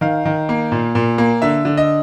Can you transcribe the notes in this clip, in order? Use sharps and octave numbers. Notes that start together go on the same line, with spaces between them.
D#3 F5
D#3
A#3
A#2
A#2
A#3
D3 E5
D3
D#5